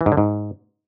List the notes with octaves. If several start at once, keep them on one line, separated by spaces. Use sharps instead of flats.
E3
G#2
D3
G#2